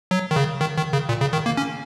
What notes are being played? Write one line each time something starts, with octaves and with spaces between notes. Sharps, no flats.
F#3
D#3
C#3
D#3
D#3
C#3
A#2
C#3
D#3
A#3
C#4